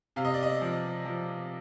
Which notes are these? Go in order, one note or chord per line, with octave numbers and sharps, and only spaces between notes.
C3 F5
D#5
D5
D#5
F3
F3